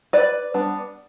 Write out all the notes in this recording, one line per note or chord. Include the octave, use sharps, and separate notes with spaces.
B4 D5
G3 B3 D4